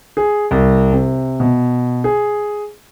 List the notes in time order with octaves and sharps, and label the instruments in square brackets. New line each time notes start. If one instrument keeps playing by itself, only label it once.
[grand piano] G#4
C2
C3
B2
G#4